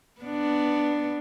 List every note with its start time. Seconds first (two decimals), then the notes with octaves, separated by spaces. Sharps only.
0.21 B3 D4